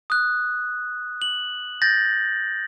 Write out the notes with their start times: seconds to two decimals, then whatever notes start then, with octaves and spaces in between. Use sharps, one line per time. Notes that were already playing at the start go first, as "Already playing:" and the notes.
0.10 D#6 F#6
1.22 F#7
1.82 G6 A6 A#6